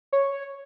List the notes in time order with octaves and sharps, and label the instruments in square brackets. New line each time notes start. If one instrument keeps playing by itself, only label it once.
[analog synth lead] C#5